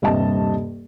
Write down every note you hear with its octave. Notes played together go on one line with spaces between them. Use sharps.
D#1 G2 C3 D#5 A5